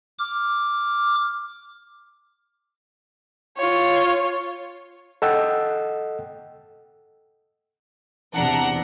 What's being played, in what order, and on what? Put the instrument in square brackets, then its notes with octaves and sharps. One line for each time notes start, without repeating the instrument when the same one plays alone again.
[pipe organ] D6 F6
[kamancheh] F4 C#5
[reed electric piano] A4 D#5 F#5 G5 E6
[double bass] E2 C3 [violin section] D4 F#5 A#5